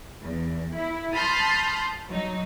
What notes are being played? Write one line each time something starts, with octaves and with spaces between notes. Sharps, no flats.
E2
E4
A5 B5 C6 D#6 F6 G6
F#3 D#4